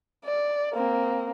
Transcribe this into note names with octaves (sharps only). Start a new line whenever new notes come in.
D5
A#3 C4